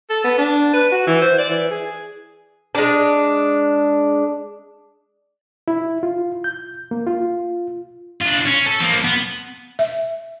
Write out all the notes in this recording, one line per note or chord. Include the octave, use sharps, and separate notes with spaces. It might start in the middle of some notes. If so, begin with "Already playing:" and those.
A4
B3
D4
B4
F#4
E3
C5
D5
E3
G#4
G#3 D4
E4
F4
G6
A#3
F4
D4 F4
C#4
A4
F3 A#3
B3
E5